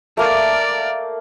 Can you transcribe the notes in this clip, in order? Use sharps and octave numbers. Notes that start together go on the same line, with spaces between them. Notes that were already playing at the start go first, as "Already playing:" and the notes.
A3 A#3 A#4 D5